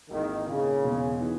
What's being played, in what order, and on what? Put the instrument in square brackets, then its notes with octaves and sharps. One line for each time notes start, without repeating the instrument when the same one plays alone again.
[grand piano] G#1 G#2 E3 A#3 E4 [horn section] D#3
[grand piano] A#2 A#3 D#4 [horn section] C#3
[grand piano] E1 E2 B2 G#3 C#4
E3 B3 D#4